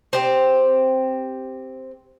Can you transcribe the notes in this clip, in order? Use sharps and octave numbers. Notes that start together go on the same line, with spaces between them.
C4 G4 C5